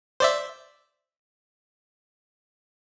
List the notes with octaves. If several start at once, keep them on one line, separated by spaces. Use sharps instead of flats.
C5 D5 E5